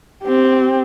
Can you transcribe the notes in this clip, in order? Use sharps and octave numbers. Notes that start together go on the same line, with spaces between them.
C4 G4